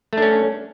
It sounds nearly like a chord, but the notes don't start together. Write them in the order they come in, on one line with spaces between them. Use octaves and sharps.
A3 D4 C#4